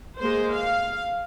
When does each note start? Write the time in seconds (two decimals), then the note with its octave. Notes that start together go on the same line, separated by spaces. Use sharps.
0.20 G#3 A#3 C5
0.54 F5